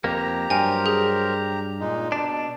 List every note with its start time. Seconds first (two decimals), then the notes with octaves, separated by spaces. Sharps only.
0.04 F2 A#3 G4 A#5
0.50 G2 F#3 A#4 C5 G5 G#5
0.86 G#4
1.80 A#2 G#3 D#4
2.12 B2 D4